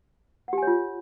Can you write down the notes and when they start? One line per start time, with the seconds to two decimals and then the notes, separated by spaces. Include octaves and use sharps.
0.48 F#5
0.53 G4
0.58 G#5
0.62 C#5
0.67 F4